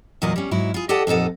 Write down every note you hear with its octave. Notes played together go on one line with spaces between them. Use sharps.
E2 A#2 F#3 A#3 E4 D#5
G3 C#4
G#2 F#3 E4
F4 G#4
G4 A4 D5 D#5 F#5 A5
F2 A#2 D#4 A4 F#5